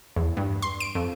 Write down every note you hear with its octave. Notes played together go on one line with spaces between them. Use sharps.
E2
G2
C6
D7
F2